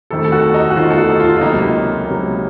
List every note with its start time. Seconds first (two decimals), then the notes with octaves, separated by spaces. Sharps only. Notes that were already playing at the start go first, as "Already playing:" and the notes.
0.10 F2 D#3 A3 A4
0.24 A4
0.32 F#4
0.54 D#4
0.70 F#4
0.76 F2 D#3 A3 F4
0.90 A4
0.98 F#4
1.09 D#4
1.20 F4
1.36 F4
1.41 C#2 C3 F#3 A#3 D#4
2.07 C#2 C3 F#3 A#3